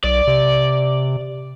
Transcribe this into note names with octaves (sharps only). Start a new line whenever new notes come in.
B1 D5
C3